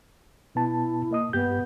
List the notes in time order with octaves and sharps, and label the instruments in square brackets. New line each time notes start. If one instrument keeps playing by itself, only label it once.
[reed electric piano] B2 B3 A5 [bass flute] E4
[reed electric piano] A#3 D#5 D#6
[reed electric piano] G2 G4 G6 [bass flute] B3